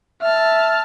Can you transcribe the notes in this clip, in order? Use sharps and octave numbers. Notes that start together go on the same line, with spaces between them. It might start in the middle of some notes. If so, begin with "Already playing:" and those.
E5 A5 F6